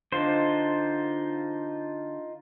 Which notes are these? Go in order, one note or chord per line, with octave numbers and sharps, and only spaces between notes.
D3 D#4 F4 C5